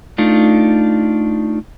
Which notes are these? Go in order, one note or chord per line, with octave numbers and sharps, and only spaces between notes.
A3 D4 D#4 F4